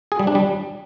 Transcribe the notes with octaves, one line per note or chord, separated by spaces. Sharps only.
G#4
G3
D4
G3